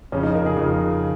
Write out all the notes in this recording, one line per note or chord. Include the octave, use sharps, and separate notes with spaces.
F2 C#3 C#4
D#4
A#4
G#4
F2 C#3